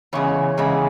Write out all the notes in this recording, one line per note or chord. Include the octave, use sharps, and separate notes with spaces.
E2 C#3 G#3 C#5
E2 C#3 G#3